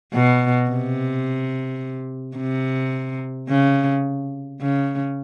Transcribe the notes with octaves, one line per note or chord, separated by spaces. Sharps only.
B2
C3
C3
C#3
C#3